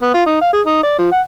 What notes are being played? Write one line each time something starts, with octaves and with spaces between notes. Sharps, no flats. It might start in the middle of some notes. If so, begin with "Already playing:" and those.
B3
F4
D#4
F5
G#4
D#4
D5
F3
F#5